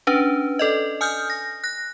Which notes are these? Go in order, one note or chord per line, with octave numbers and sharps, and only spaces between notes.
C#4 D4 B4
A4 D5 D#5
G#5 D#6 F6 G6
A#6
F#6 A#6